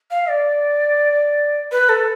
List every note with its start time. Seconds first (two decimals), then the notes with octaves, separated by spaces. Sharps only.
0.11 F5
0.29 D5
1.71 B4
1.89 A4